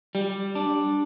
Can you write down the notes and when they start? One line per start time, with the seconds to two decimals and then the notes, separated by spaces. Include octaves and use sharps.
0.15 G3
0.55 D4